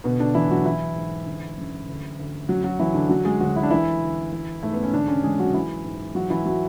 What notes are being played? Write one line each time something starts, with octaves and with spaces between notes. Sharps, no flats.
B2 D3 B3
D3 D4
E2 E3 E4
F#3 F#4
E3 E4
G#2
D3
F#2
D2
D2
F#2 F#3 F#4
F#3 F#4
F#2 E3 E4
D3 D4
D3 F#3 F#4
G#3 G#4
D2 F#3 F#4
E4
D4
D2 E3 E4
D2
E3
G#2 A3
B3
C#4
E2 D3 D4
C#3 C#4
E2 G#3 G#4
F#3 F#4
E3 E4
G#2
E3 F#3 F#4
E3 E4
F#3 F#4